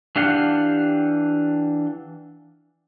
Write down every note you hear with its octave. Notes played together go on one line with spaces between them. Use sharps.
E3 D4 G4 F5 F#5